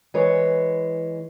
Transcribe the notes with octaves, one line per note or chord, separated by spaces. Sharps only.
E3 G#3 C#5